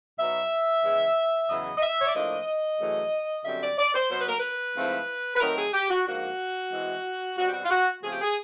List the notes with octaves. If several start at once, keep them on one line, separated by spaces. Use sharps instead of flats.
B2 F#3 B3 D#4 E5
C#3 E3 G#3
E2 C#3 F#3 B3 E4 D#5
D#5
E5
C#5
D5
A2 F3 A#3 D4 F4 D#5
F#2 C#3 E3 A3
F#2 D3 G3 C4 E5
D5
D5
C5
B2 F#3 B3 C5
B4
A#4
B4
G#2 F3 A3 C4 E4
B4
D#3 F#3 A3 C4 D#4 A#4
G#4
G4
F#4
G#2 F3 A#3 D4 F#4
E3 G#3 C4 E4
B2 G3 C4 F#4
G4
F#4
F4
F#4
C#3 F3 A3 C4 F4 G#4
G4
G#4